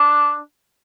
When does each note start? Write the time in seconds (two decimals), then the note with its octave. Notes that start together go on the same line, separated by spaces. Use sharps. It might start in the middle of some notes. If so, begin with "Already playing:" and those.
Already playing: D4